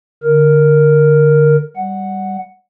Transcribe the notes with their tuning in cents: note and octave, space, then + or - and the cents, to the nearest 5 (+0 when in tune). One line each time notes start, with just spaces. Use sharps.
D3 +0 A#4 +0
G3 +0 F#5 +0